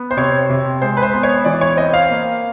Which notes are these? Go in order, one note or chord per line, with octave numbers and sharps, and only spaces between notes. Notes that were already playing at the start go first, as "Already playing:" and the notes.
Already playing: B3
C5
C3 C#5
C3
G#3 C5
B4
C5
B3
C#5
E3 D5
C#5
C4 D#5
F5
A#3